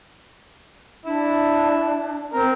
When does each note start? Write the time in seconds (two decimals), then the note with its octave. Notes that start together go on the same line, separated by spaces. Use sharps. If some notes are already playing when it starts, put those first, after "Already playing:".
1.05 D4 E4
2.33 C4 A#4